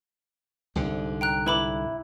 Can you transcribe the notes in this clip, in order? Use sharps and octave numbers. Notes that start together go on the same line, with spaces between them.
C2 G#2 D3
G5 A#5 F#6
E4 B4 B5 D6